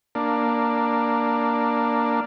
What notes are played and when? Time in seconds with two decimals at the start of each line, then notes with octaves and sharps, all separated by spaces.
0.15 A#3 D4